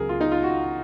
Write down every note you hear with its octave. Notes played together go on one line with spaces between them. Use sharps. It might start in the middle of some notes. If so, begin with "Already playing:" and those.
Already playing: C#2 C#3 F#3 G#4 A#4
F4
D#4
F4
F#4